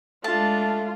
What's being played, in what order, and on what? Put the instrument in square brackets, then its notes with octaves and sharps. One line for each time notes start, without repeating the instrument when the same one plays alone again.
[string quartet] G#3 D4 [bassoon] A3 [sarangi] F4 [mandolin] A5